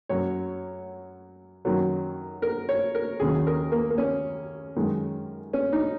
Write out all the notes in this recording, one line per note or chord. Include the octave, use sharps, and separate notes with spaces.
F#2 F#3 C#5
F#2 D#3 F#3
A#4
C#5
A#4
D#2 C#3 F#3 G#4
A#4
A#3
A#3
C#4
F#2 D#3 G#3
C#4
D#4